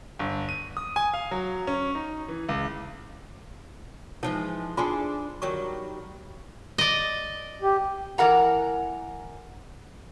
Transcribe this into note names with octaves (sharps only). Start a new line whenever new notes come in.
G1
D#7
D#6
G#5
F5
F#3
C#4
D#4
E3
C#2
E3 F3 G#3 D#4 C#5
D4 F4 G#4 A4 C6
D#3 F#3 G3 C#6
D5 D#5
G4
E3 A#4 F#5 A#5